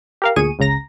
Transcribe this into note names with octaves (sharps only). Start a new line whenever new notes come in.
G4 A#4 F5
D2 A#2 G#4 C#6 D#7
G1 C#2 C#3 A#5 A#6